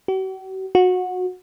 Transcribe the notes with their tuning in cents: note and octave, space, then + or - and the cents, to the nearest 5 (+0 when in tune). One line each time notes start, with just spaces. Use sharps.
F#4 +45
F#4 -20